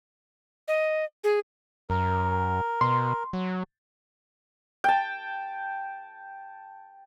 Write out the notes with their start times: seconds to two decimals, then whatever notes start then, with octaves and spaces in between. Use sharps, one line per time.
0.68 D#5
1.24 G#4
1.90 F#2 A#4
2.81 B2 C6
3.33 F#3
4.84 G5 A5